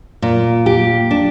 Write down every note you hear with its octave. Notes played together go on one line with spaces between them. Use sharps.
A#2
G4
D4